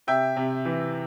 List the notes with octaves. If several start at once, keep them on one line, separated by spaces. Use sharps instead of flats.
C3 E5 G5
C3
E3